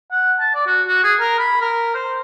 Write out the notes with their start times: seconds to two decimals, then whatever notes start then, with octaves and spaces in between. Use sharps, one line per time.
0.11 F#5
0.40 A5
0.55 D5
0.66 F#4
0.88 F#4
1.04 G#4
1.20 A#4
1.39 B5
1.61 A#4
1.95 C5